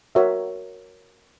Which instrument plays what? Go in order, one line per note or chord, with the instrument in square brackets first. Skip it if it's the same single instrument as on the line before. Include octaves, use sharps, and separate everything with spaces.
[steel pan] F#4 A#4 C#5 E5